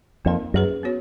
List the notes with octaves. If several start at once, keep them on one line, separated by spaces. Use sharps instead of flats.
F2 A#3 D#4 A#4
F#2 C#4 G#4 B4
B3 F#4 C#5